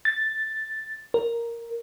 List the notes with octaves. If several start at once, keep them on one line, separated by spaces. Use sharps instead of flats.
A6
A#4